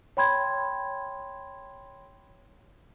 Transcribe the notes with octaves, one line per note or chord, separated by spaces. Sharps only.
C#5 G5 B5 C6 G#6